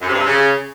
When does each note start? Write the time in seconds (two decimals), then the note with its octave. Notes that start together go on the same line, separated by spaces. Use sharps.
0.02 F#2
0.08 C3
0.14 G2
0.20 C3
0.26 C#3